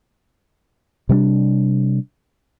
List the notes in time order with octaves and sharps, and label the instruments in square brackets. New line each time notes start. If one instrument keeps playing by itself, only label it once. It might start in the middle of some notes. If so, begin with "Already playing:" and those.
[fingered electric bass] C3 G3 A#3 D4